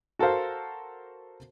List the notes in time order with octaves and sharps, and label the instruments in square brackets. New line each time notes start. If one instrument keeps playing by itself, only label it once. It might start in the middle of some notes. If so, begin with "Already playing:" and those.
[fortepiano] F#4 A4 A#4 C5 F5